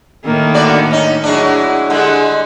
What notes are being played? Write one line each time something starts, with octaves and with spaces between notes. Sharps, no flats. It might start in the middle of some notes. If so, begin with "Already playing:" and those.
A2 D#3 A#3
D3 F#4 D5
C#4 D#4
F#3 G#3 D4 E4
D3 G3 G#3